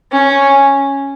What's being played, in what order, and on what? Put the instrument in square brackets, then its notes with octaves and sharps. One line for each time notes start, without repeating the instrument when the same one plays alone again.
[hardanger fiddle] C#4